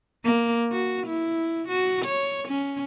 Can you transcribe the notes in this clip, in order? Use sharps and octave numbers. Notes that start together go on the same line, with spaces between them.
A#3
F#4
E4
F#4
C#5
C#4